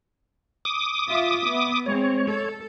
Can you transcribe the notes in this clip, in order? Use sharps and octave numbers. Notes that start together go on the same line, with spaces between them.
D6 D#6
F4 E5
B3 E5
G#3 C4 C#5
A4